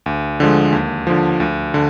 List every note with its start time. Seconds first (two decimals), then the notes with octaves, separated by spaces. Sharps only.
0.06 D2
0.40 D3 F3 G#3
0.72 D#2
1.07 D3 F3
1.40 D2
1.74 D3